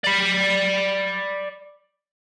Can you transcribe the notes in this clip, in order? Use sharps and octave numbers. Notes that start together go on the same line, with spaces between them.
D5 B5